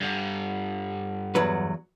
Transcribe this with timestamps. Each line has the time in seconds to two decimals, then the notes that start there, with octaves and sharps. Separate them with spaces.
0.01 G2 D3
1.35 E2 F#3 B4